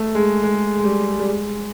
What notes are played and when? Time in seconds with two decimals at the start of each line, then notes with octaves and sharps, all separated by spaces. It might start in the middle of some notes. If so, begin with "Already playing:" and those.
Already playing: A3
0.15 G#3
0.43 G#3
0.79 G#3
0.84 G3
1.20 G3
1.26 G#3